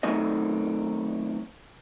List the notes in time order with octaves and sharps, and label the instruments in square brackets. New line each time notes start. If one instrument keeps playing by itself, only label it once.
[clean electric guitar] D#3 F#3 A3 C4 D#4 D#5